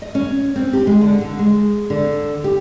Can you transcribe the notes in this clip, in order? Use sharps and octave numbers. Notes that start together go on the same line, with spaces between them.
D#5
C#4
C4
G4
G#3
D3
D3
G#3
D3
G4